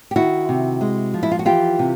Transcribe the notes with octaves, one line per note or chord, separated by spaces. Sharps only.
G4
D#3 E4 F#4
C3
G#3
F3
E4
F4
F#4
E3 F4 G4
C3